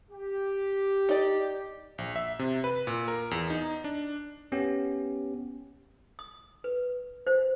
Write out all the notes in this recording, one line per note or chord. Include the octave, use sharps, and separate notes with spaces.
G4
D#4 D5
A#1
E5
C3
B4
A#2
A#4
E2
D#4
D4
B3 C#4 G4
D#6
B4
C5